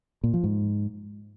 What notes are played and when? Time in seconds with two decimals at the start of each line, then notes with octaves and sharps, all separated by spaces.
0.24 A#2
0.34 F3
0.44 G#2